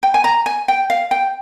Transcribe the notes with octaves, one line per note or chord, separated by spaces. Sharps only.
G5
G#5
A#5
G#5
G5
F5
G5